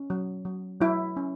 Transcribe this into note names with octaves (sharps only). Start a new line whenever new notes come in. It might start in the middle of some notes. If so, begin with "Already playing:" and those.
Already playing: C#4
F#3
F#3
F#3 E4
C#4